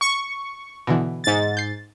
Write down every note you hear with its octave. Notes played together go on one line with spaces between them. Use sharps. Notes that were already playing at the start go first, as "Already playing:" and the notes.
C#6
B2 D3 E3
G#2 A6
G6 C7